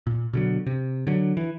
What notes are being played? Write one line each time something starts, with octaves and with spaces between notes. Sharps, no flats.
A#2
B2 D3 F#3
C3
D3 F#3
E3